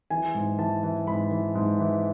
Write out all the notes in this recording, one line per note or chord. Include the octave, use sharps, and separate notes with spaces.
E3 G#5
G#2
E3 A5
E3
G#2 B5
E3
G#2
E3